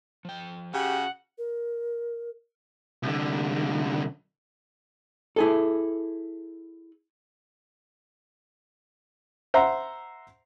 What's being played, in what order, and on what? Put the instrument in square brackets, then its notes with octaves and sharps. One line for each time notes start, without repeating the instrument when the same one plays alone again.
[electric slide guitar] F3 G5
[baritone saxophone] C#3 [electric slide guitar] F#4 [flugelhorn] G4 [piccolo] F#5
[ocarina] A#4
[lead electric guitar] C2 D3
[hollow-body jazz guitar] E4 G#4 A4
[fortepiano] C5 E5 F#5 A#5